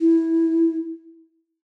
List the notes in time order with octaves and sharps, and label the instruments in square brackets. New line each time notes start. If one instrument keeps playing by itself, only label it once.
[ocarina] E4